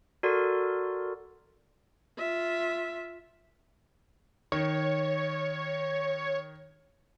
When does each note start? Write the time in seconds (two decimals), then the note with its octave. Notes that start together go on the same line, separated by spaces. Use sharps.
0.23 F#4 A4 A#4 D5 C6
2.18 F4 E5
4.52 D#3 C#5